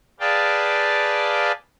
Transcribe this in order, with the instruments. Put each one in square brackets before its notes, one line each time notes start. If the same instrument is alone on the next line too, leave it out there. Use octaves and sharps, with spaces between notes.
[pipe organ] G#4 B4 D5 F5 G5 A5